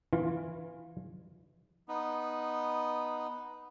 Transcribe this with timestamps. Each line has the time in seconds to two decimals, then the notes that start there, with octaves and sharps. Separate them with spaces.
0.13 E3 F4
1.88 B3 D#4